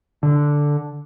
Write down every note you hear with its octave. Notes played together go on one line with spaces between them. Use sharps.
D3